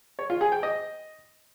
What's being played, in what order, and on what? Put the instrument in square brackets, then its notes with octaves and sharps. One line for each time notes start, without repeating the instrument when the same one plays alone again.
[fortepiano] C#5
F4
G#4
G5
D#5